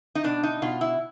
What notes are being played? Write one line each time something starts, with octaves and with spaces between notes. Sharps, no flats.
D#4
B2 D4
D#4
B2 F4
E4